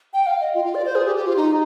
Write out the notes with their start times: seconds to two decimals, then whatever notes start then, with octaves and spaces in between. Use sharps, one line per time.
0.13 G5
0.26 F5
0.41 D#5
0.54 F4
0.65 F4
0.75 D5
0.86 C5
0.95 G#4
1.06 G4
1.16 G4
1.27 F4
1.37 D#4